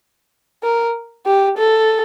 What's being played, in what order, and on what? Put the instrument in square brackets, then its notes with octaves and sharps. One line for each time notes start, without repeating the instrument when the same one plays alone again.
[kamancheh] A#4
G4
A4